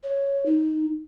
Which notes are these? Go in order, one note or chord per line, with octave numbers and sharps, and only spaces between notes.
C#5
D#4